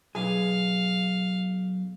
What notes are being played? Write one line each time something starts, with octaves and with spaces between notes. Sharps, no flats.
B1 G#4 F5